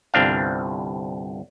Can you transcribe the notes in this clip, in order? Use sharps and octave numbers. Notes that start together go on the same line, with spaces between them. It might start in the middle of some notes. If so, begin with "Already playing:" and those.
G1 C2 C4 D4 F5